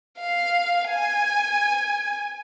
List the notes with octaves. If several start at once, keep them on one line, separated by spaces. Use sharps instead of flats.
F5
G#5